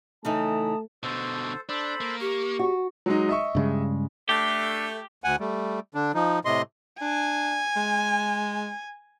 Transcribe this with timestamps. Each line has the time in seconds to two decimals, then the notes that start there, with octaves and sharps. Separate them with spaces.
0.25 C#3 E3 A3 D#4 A5 A#5 D#6
1.03 B2 D3 A4 C5
1.69 D4 A4 C5 B5
2.01 A#3
2.21 G4 C#6
2.59 F#4
3.06 F#3 G#3 D#4
3.29 D#5 E5 C#6
3.55 G2 C#3 G#3
4.29 A3 D4 G4
5.24 D2 F#5 G#5
5.39 G3 A3
5.95 D3 D4
6.14 F3 D#4
6.45 A2 C3 D#5 C6
7.01 D4 G#5
7.76 G#3